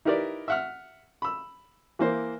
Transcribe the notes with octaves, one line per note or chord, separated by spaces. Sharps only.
D#4 E4 G4 A#4 B4 D5
E5 F#5 F6
B5 E6
E3 A#3 C5